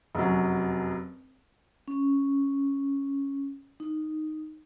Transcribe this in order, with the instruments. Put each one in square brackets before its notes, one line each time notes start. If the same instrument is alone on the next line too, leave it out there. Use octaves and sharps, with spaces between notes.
[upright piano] F1 F#2 F#3
[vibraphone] C#4
D#4